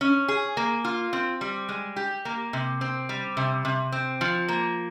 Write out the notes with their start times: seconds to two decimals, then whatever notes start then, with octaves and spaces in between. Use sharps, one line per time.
0.01 C#4
0.28 G#4
0.57 A#3
0.85 F4
1.13 C4
1.41 G3
1.69 G#3
1.96 G4
2.25 A#3
2.53 C3
2.81 C4
3.09 G3
3.37 C3
3.65 C3
3.92 C4
4.21 F3
4.49 A#3